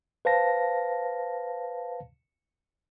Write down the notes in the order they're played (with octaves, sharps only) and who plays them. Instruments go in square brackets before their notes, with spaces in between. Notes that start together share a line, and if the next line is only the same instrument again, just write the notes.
[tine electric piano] B4 C5 F5 A5 A#6